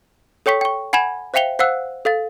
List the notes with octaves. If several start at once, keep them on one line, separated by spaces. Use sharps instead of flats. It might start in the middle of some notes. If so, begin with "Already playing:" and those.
A4 C#5 G5 C#6 B6
G5 C#6
F#5 G#5 B5 G#6 E7
C5 E5 F5 G5 F7 G7
C5 F5 F#5 E6 F#6
A4 F5 A6